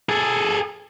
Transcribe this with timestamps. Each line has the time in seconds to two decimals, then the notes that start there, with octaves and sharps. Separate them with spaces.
0.09 G#4 A4